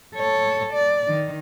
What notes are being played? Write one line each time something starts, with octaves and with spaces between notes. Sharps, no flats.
A4 C#5
D5
D#3